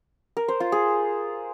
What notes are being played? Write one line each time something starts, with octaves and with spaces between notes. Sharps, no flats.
A#4
C5
F4
G#4